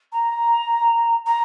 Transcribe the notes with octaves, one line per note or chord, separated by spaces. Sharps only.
A#5
A#5